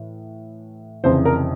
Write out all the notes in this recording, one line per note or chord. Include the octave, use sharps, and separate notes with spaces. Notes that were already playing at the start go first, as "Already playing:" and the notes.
Already playing: A2 E3
F1 F2 C#3 E3 C5
A#4